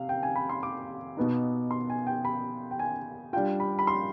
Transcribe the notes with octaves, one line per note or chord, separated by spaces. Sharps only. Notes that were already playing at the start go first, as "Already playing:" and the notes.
Already playing: C3 F5
G5
G#5
B5
C6
D6
B2 B3 D#4
C6
G#5
G5
B5
G5
G#5
G3 D4 F4 G5
B5
B5
C6